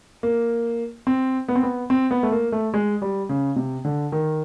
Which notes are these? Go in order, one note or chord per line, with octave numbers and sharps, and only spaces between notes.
A#3
C4
B3
C4
B3
C4
B3
A3
A#3
A3
G#3
G3
C#3
C3
D3
D#3